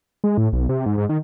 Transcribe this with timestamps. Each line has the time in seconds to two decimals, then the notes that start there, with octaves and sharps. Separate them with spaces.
0.24 G#3
0.38 A2
0.53 B1
0.69 C3
0.86 G#2
0.98 G#2
1.09 D#3